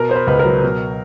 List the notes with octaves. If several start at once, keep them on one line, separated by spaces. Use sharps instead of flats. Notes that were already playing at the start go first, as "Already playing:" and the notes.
Already playing: B2 A#4
B3 C5
B4
C#2 B4
A#4
F#3
B2